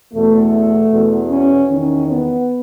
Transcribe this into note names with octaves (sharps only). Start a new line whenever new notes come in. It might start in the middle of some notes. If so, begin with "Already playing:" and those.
E2 B2 A3
E2 B2
C#4
E2 D#3 C#4
B3